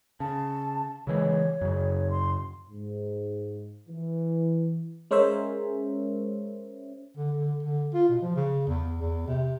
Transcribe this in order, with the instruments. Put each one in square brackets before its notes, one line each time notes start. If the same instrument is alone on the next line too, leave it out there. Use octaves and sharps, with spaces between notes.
[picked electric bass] C#3 [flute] A5
[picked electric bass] C#3 E3 G#3 [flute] C#5
[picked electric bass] F#2 C#3
[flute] C6
[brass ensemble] G#2
E3
[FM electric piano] G#3 C#4 A#4 C5 C#5 E5
[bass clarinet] D3
D3
D3
F4
B2
F3
C#3
E2
E2
C3